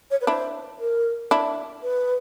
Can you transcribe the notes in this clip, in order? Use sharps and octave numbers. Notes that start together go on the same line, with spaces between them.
C#5
B4
D4 E4 C5
A#4
D4 E4
B4